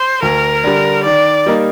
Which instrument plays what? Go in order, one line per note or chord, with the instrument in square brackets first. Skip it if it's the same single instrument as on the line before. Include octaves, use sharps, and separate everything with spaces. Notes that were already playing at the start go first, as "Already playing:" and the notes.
Already playing: [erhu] C5
[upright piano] D2 [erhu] A#4
[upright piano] D3 G3
[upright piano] D#3 [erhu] D5
[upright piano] G3 A#3 D#4 A#4